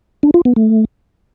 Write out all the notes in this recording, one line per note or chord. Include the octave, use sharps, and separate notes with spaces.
D4
F4
B3
A3